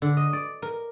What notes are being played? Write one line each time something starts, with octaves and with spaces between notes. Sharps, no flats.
D3
D#5
D5
A#4